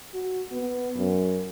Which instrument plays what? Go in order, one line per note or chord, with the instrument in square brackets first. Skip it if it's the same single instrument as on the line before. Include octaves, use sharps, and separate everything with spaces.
[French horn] F#4
B3
F#2